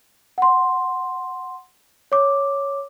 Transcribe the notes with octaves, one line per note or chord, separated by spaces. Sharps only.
F#5 C6
C#5 D6